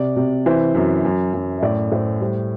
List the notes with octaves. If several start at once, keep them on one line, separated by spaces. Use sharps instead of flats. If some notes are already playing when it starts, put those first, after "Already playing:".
Already playing: C3 D5
C3
E3 C5
F#2
F#2
F#2
E5
A2 D5
A2 C5
G3 C5